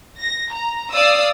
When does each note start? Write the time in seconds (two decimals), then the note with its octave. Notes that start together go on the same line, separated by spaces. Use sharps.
0.20 A#6
0.53 A#5
0.91 D5 F5 D#6 E6